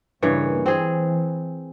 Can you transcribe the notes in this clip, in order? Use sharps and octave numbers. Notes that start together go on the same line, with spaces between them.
G2 C#3 E3 A#3 C#5
E3 C4 G#4